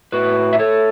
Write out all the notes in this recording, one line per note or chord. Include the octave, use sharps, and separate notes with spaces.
A2 F#4 B4
E5
A3 A4 C#5